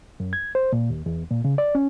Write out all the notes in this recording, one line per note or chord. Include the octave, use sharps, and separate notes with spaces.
F#2
G#6
C5
A#2
D#2
E2
A#2
C#3
D5
C#4